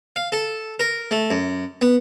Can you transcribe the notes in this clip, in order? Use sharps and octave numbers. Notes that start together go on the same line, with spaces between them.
F5
A4
A#4
A3
F#2
B3